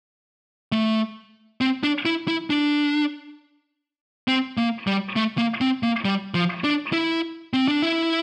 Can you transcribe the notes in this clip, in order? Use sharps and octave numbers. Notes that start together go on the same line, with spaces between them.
A3
C4
D4
E4
E4
D4
C4
A#3
G3
A3
A#3
C4
A#3
G3
F3
D4
E4
C4
D4
E4